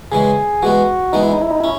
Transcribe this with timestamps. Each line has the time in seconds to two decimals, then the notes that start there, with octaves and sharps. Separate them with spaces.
0.12 C#3 E3 G#3 G#4
0.62 E3 G#3 B3 F#4
1.13 E3 G#3 B3 D#4
1.23 E4
1.32 D#4
1.42 E4
1.51 D#4
1.60 C#4 E4